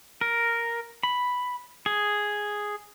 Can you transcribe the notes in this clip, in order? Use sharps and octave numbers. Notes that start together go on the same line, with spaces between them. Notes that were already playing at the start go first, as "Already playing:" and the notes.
A#4
B5
G#4